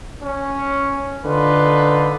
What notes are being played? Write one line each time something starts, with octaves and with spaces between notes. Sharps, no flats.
C#4
D3 D#4 F4 B4